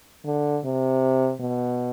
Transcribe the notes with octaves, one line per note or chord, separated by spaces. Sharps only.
D3
C3
B2